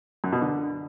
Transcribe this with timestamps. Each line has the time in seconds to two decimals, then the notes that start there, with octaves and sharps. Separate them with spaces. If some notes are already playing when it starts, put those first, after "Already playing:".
0.24 F#2
0.32 B2
0.41 D3